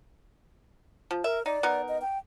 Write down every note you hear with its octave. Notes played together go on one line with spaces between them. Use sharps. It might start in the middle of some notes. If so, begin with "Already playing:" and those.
F3
A#4 E5
D#4 D5
B3 D#4 A#4
D#5
G5